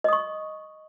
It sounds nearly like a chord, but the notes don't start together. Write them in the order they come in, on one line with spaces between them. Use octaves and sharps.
D#5 D#6 C#6